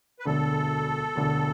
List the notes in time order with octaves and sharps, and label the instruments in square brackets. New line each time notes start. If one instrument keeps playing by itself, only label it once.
[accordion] B4
[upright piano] E1 D2 D3 [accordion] A4
[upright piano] E1 D2 D3